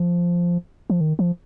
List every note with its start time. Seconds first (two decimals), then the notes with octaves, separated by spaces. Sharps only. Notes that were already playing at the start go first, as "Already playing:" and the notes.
Already playing: F3
0.90 F3
1.01 D#3
1.19 F3